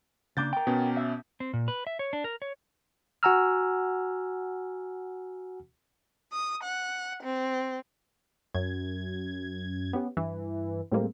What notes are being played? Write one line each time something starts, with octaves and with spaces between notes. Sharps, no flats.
C#3 A#3 D4 D6 G6 A6
A#4 G5
B2 B3 C#4
E5
C4
A#2
B4
E5
C#5
D4
A#4
C#5
F#4 F#5 G#5 A#5 E6 F6
D#6
F#5
C4
F#2 G#6
B3 C#4 G4
G2 E3
A2 G3 G#3 A#3 C4